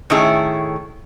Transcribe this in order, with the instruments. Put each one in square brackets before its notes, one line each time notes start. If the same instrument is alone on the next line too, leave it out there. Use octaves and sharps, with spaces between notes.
[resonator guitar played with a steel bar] A2 D#3 A3 C#4 E4 G#4